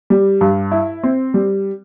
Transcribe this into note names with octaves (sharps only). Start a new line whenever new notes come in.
G3
G2
E4
C4
G3